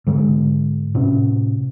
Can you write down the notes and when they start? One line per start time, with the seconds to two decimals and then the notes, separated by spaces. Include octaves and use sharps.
0.07 G#2 D3 G#3
0.95 A2 C3 C#4